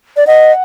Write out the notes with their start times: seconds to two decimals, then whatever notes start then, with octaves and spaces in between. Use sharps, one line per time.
0.17 D5
0.27 D#5 F#5